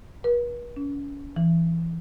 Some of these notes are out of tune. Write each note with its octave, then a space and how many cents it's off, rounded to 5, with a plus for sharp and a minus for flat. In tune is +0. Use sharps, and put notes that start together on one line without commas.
B4 -45
C#4 +35
E3 +20